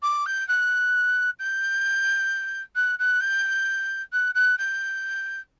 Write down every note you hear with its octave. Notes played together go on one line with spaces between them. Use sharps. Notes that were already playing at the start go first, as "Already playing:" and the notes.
D6
G6
F#6
G6
F#6
F#6
G6
F#6
F#6
G6